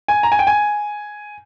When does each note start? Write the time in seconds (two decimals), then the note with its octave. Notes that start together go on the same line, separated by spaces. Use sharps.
0.08 G#5
0.23 A#5
0.32 G#5
0.39 G5
0.47 G#5